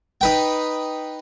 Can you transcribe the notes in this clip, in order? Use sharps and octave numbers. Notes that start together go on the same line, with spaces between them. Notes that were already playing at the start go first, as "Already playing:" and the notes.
D#4 B4 G5